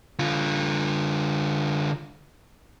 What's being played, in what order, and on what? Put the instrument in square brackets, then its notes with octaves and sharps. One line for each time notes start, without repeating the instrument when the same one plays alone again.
[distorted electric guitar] D3 F4